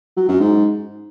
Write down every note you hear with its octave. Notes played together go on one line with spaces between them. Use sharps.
F#3
F#2
G#2